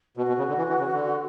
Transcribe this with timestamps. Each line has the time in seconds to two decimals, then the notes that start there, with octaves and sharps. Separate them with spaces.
0.17 B2 F#4
0.28 B2
0.38 C#3
0.48 D3
0.58 E3
0.69 E3
0.79 C#3
0.93 D3